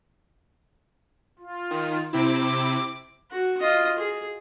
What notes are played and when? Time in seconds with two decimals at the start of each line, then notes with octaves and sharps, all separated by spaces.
1.39 F4
1.71 D#3
2.13 C3 C4 E4 D6
3.31 F#4
3.60 F4 D#5
3.98 G#4